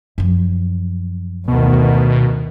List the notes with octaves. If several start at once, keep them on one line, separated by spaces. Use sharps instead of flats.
F#2 F3
D2 B2 D#3